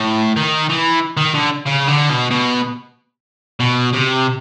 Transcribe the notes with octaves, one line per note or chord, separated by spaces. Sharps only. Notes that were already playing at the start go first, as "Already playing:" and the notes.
Already playing: A2
D#3
E3
D#3
D3
C#3
D3
B2
B2
B2
C3